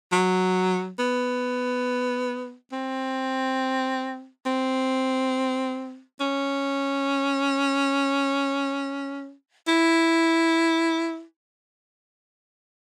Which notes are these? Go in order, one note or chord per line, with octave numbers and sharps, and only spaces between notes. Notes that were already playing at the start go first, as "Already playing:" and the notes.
F#3
B3
C4
C4
C#4
E4